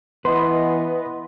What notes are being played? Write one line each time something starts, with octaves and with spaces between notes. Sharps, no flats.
E3 B3 B4 D#5 C6